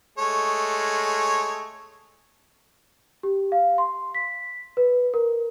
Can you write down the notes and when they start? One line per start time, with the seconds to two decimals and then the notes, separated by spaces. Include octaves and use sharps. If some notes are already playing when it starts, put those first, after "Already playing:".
0.18 G#3 A3 C#5
3.23 G4
3.52 F5
3.78 C6
4.15 B6
4.77 B4
5.14 A#4